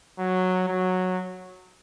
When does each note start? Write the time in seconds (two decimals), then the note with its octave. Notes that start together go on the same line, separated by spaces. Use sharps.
0.19 F#3
0.68 F#3